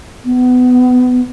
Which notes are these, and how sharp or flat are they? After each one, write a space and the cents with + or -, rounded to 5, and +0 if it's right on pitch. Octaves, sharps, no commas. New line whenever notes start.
B3 +20